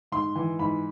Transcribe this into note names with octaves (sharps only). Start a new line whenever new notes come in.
G#2 C6
E3
G#2 B5